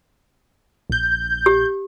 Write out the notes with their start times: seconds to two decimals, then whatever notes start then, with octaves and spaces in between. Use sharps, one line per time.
0.90 A#1 G6
1.46 G4